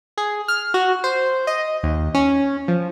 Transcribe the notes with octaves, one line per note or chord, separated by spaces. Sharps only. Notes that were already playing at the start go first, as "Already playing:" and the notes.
G#4
F6
F#4
C5
D#5
D#2
C#4
F3